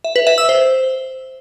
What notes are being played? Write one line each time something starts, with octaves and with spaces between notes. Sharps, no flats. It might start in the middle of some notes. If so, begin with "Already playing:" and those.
E5
B4
E5
E6
C5